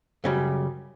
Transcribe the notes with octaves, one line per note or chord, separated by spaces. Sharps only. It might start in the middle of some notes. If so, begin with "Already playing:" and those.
F#2 C#3 G3